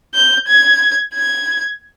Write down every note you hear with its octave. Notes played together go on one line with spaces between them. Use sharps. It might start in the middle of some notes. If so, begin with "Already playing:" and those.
G6
G#6
G#6